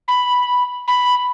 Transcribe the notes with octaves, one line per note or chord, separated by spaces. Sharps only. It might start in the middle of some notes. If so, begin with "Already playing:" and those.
B5
B5